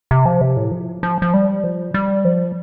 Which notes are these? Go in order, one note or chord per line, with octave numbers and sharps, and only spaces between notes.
C3
F3
C3
A2
F3
F3
F3
G3
F3
G3
F3